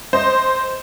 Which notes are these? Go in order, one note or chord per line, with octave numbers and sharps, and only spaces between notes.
C5 D#5